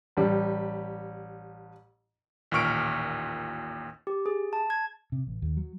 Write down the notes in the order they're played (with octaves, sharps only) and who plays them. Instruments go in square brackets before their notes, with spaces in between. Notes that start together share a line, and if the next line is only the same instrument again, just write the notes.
[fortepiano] A1 G3
[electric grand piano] A1 D#2 A#2 C#6 F6 D7
[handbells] G4
G#4
A5
G#6
[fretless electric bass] C3
A1
D#2
F#3